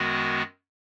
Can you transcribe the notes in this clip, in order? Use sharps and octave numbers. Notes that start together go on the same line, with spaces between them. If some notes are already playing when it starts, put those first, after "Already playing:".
Already playing: F#2 D#3 G#3 B3 F#4